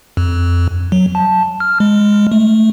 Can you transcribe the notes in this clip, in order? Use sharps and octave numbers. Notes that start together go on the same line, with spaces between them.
F2
F#3
A5
F6
G#3
A3